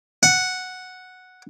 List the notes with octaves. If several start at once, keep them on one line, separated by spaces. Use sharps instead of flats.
F#5